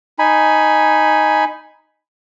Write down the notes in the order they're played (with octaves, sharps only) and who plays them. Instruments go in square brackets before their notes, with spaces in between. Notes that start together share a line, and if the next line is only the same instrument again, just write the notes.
[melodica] D#4 G#5 B5